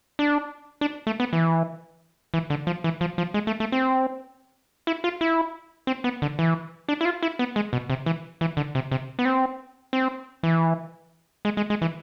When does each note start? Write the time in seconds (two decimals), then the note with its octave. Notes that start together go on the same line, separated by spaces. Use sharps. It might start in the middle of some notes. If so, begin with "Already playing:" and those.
0.19 D4
0.81 D4
1.07 A3
1.20 B3
1.33 E3
2.34 E3
2.50 D3
2.67 F3
2.84 E3
3.01 F3
3.18 F3
3.34 G#3
3.47 A3
3.60 A3
3.72 C4
4.87 E4
5.04 F4
5.21 E4
5.87 C4
6.04 B3
6.22 D3
6.39 E3
6.89 D4
7.01 E4
7.05 F4
7.23 E4
7.39 B3
7.56 G#3
7.73 B2
7.90 C3
8.06 E3
8.41 E3
8.57 D3
8.75 C3
8.91 C3
9.19 B3
9.25 C4
9.93 C4
10.43 E3
11.45 G#3
11.57 G#3
11.70 G#3
11.82 E3